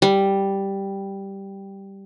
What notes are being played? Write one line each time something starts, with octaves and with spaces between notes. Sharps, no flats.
G3